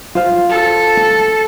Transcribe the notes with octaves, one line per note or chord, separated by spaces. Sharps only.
F4 C5 F5
A4